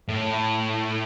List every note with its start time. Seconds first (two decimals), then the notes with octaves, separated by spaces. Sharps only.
0.08 A2